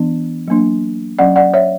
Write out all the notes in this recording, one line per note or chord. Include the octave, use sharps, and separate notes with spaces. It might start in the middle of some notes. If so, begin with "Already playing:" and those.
Already playing: E3 B3 D4
F#3 A#3 D4
F#3 C#4 D5 F#5
D5 F#5
C#5 E5